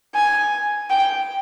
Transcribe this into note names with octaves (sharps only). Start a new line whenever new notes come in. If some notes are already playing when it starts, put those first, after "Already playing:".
G#5
G5